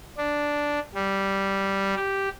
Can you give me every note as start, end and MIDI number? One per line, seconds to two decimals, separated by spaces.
0.18 0.80 62
0.95 1.95 55
1.96 2.29 67